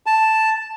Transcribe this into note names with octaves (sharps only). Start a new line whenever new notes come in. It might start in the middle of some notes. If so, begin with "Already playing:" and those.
A5